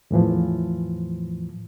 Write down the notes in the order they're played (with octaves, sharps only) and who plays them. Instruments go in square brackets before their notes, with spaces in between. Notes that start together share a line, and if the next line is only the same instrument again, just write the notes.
[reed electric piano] E2 A2 E3 F3